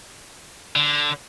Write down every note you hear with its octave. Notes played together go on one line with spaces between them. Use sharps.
D3